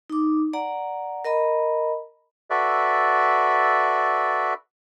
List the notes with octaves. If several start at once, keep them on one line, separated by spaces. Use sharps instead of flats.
D#4 D6
D5 F#5 A#5
A#4 D#5 A#5 B5
F#4 A4 B4 D5 E5